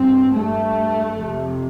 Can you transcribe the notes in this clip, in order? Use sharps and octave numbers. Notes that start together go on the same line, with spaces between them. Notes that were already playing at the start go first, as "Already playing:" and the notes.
Already playing: G2 C4
G2 A3
F2 C3